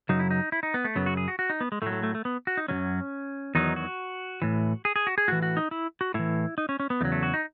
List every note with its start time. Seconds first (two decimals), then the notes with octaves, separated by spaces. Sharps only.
0.09 F#2 C#3 F#3 D#4
0.19 E4
0.31 D#4
0.52 E4
0.63 D#4
0.74 B3
0.85 A3
0.96 F#2 C#3 F#3 B3
1.06 F#4
1.17 G#4
1.28 F#4
1.39 F#4
1.50 D#4
1.61 B3
1.72 G#3
1.82 A2 F#3 A3
1.93 A3
2.03 A3
2.15 A3
2.25 B3
2.47 F#4
2.57 D#4
2.68 F#2 D#3 F#3 C#4
3.55 E2 D#3 F#3 D#4
3.76 F#4
4.42 A2 E3
4.85 G#4
4.96 G#4
5.07 F#4
5.18 G#4
5.28 A2 E3 F#4
5.42 F#4
5.57 D#4
5.71 E4
6.01 F#4
6.14 A2 E3 E4
6.58 D#4
6.69 C#4
6.80 C#4
6.90 B3
7.01 E2 C#3 F#3 A3
7.12 A3
7.23 F#4
7.34 D#4